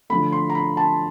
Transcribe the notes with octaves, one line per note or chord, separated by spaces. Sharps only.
D3 F3 A3 B5
C6
A#5
B5
A5